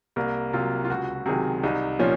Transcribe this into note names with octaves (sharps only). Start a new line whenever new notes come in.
C2 A#3
C3 F#3 F4
F4
C#2 F#4
C3 D#3 F#3 G#4
C2 D#4
A#2 F3 C#4